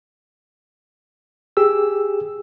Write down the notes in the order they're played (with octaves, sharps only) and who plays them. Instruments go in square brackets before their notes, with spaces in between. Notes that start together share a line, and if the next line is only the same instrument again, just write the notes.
[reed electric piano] G4 G#4 E6